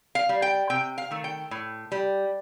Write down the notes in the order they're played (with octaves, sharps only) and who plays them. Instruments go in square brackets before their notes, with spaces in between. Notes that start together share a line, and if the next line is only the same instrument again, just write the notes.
[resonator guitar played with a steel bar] F5
G3
G5
C3 G5
F5
D#3 A3
G5
A2
G3